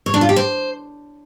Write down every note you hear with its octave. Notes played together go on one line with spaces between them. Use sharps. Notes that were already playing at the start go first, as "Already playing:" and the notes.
C#5
D4
F4
G4
C5